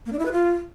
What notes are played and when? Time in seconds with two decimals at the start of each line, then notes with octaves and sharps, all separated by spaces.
0.06 A#3
0.12 D4
0.19 E4
0.25 B4
0.32 F4